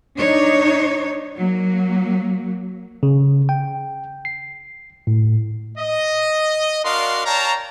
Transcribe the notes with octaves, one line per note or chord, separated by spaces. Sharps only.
D4 D#4 C#5
F#3 A#3
C#3
G5
C7
A2
D#5
D4 F#4 A#4 D5 F5 C6
C#5 F5 G5 A5 A#5